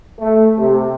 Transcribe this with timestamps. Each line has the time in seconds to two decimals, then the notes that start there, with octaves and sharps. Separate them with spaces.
0.18 A3
0.58 C3